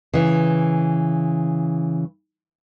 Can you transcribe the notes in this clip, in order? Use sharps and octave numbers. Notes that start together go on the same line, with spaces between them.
C#3 E3